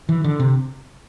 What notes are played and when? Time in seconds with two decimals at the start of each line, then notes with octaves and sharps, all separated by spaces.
0.09 E3
0.24 D3
0.40 C3